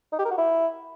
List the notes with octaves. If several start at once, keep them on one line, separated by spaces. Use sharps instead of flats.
D#4
G4
A#4
F#4
E4